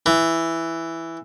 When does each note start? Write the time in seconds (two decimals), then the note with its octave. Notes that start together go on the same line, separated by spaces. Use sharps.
0.06 E3